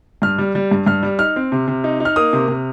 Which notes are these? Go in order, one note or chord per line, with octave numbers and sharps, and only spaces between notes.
G2 F6
G3
G3
G2
G2 F6
G3
D#4 F6
C4
C3
C3
D#4
D#4
F6
A#3 D#6
C3
C3